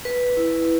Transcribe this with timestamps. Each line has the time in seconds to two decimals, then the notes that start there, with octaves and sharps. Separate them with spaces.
0.05 B4
0.37 E4